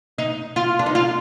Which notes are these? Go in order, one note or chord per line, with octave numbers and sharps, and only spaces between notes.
D#4
F4
D4
D#4
F4